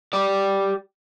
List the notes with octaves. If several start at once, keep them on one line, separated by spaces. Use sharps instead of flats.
G4 D5